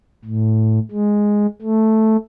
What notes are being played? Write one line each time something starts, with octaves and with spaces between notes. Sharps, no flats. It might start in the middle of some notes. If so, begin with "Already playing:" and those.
A2
G#3
A3